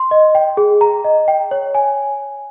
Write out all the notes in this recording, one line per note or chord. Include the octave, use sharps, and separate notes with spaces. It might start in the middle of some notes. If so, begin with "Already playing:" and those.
Already playing: C6
D#5
G5
G#4
A#5
D#5
G5
C#5
G#5